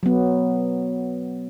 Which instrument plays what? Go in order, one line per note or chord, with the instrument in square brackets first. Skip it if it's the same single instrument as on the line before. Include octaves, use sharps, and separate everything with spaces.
[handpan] F#3 B3